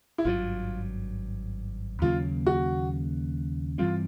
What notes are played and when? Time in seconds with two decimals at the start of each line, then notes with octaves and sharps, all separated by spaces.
0.18 E4
0.25 G#1 G2 D#3 F#3 F4
2.02 D#2 C#3 F#3 A#3 F4
2.46 F#4
3.78 G2 E3 G3 C4 F4